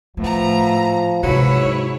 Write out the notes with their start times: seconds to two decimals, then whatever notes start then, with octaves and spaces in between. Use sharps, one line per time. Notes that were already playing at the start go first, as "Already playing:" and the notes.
0.17 A2 F3 A3 B3 A#5
1.23 G#2 C3 F#3 E4 B4 C#5